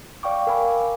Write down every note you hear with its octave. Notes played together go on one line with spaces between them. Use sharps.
D5 F5 G5 C#6 D6
A#4 F5 G#5 B5 D6